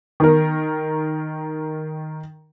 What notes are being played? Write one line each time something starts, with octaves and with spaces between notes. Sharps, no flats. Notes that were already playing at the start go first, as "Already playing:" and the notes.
D#3 A#4